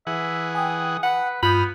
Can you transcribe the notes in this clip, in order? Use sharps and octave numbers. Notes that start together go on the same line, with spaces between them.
E3 G#4 E5 F#5
G5 G#5 D#6
B4 F#5
G2 B3 F4 B5 D#6 F6 G6